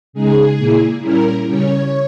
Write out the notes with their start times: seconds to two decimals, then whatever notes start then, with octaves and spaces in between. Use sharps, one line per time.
0.13 C#3 G#3 D#4 G#4
0.58 A#2 A#3 E4
1.02 A#2 G3 C#4 E4 A#4
1.46 C#3 G3 C#4 C#5